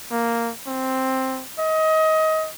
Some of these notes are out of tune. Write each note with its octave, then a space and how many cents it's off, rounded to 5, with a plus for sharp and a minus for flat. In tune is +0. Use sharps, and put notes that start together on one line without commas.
A#3 -5
C4 +5
D#5 +25